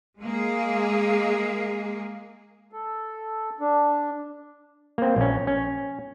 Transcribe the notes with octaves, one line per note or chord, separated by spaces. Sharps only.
G#3 A#3 G#4
A4
D4
A#3 C4
A#1 C#4
C#4